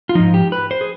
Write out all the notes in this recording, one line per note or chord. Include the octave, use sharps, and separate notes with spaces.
F4
G#2 F3 D#4
G4
B4
C5
G#4